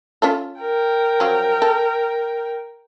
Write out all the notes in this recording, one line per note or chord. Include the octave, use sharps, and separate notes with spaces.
C#4 F4 A4
A#4 G5
F3 F#3 C#4
A4